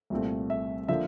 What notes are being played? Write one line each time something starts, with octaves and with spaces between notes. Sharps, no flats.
C2 A#2 A3 C4
E5
D3 F3 A#3 E5